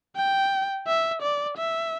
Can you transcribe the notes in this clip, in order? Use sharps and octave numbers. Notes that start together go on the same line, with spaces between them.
G5
E5
D5
E5